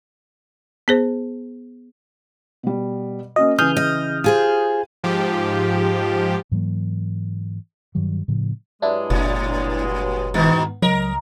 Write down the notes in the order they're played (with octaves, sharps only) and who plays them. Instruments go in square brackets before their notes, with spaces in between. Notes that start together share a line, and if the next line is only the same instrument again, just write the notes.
[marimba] B3 G#4 C5
[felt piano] B2 G3
[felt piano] A#3 C#4 F#4 [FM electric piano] D#5
[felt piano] C#3 E3 B4 [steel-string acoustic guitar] G#4 [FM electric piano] D#6 F6 G6
[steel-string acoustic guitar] D#5
[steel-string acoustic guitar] F4 G#4 C5 [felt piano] G4 D#7
[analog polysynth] G#2 F3 G4
[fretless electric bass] G#2 E3 F#3 A#3
G2 D#3 F#3 G3
A2 C#3 F3
[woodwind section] G2 F#3 G#3 [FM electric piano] D4 E4
[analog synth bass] F#1 [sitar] A2
[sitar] D#2 B2 D#3 [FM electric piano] G#2 B3
[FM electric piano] C#2 D#5 [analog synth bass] F#3 [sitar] A#4